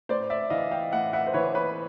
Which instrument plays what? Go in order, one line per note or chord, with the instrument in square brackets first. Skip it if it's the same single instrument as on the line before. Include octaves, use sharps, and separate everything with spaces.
[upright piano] A2 C5 D5
D5 E5
E3 D#5 F5
F5 G5
A2 E5 F#5
E5 F#5
C5
E3 B4 C#5
B4 C#5